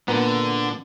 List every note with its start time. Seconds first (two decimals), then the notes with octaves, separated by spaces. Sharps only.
0.08 A#2 D3 B3 A#5